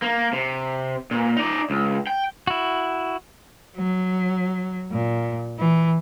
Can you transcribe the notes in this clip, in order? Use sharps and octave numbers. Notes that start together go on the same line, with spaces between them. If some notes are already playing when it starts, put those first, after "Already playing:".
A#3
C3
A#2
D#4 D5
C#2
G5
E4 F#4
F#3
A#2
E3